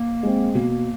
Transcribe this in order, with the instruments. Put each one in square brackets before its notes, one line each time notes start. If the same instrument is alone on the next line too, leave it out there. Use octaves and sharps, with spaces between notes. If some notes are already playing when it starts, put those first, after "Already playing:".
Already playing: [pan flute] A#3
[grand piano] G#3 C4
[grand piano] B2 [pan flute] A#3